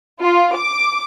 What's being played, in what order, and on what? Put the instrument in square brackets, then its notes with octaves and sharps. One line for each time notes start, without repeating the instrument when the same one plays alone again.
[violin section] F4
D6